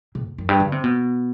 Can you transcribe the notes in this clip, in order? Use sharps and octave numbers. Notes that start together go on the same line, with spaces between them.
C3
E2
F#2
G2
D3
C3
B2